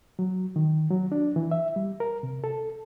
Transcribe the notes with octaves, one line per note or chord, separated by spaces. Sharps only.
F#3
D#3
F#3
D4
E3
E5
G3
A#4
C3
A4